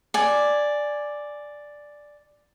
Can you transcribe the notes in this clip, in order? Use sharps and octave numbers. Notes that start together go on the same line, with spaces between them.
D5 G#5